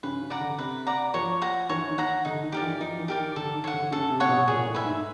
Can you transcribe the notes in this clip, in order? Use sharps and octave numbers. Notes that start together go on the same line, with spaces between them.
C#3 B4
C#3
D5 F#5 A#5
D3
C3 B4
D5 F#5 A#5
F3 C#5
F#5 A#5
E3 C#5
D#3
F#5 A#5
D3 D#4
D#3
G4 A#4 D5
E3
F3 D#4
E3
G4 A#4 D5
D#3
D3 A4
D#3
C#5 F#5
D3
C#3 A4
C3
C#5 F#5
B2
A#2 G#4
A2
B4 E5 G#5
G#2